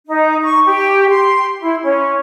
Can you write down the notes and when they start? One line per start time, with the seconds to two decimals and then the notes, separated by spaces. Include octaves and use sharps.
0.07 D#4
0.43 C#6
0.66 G4
1.10 C6
1.60 E4
1.83 C#4